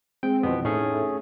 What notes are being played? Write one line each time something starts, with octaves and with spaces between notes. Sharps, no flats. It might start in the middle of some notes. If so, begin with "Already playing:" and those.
G#3 C4 G5
F2 B2 E3 B3
A2 A3 C#4 D#4 G#4